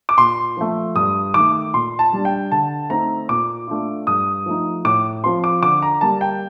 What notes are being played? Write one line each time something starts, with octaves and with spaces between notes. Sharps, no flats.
D6
A#2 C6
F3 A3
G2 D#6
D#3 A3 D6
A#2 C6
A5
G3 D4
G5
D3 A5
A3 C4 D#4 A#5
A#2 D6
A3 D4 F4
G2 D#6
F3 A3 D#4
A2 D6
F3 C4 F4 C6
D6
D3 D6
A#5
G3 A#3 A5
G5